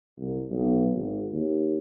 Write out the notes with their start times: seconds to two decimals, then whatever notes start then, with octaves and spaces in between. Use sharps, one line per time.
0.18 C2
0.50 B1
0.94 G#1
1.32 D#2